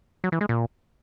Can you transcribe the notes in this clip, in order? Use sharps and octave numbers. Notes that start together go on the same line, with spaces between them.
F#3
E3
G#3
A#2